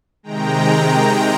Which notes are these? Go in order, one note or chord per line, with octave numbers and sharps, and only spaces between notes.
C3 D#3 G#3 G5 A#5